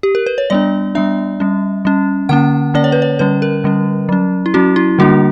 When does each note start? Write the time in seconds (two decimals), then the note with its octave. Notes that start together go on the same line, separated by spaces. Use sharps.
0.03 G4
0.15 A#4
0.26 B4
0.38 C#5
0.50 G3 B3 D4 D5
0.95 G3 B3 D4 E5
1.40 G3 C#4
1.85 G3 C#4
2.29 D3 A#3 C#4 F#5
2.74 D3 A#3 C#4 D5
2.84 C#5
2.92 B4
3.02 C#5
3.19 D3 G3 C#4 B4
3.42 A#4
3.64 D3 G3 C#4
4.09 F#3 C#4
4.46 E4
4.54 F#3 C#4 F#4
4.76 E4
4.99 D3 G3 A#3 D4 F#4